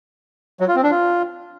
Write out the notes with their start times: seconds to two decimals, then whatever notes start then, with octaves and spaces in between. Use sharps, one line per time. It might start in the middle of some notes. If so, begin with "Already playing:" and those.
0.60 F#3
0.68 F4
0.76 C4
0.83 D4
0.91 F4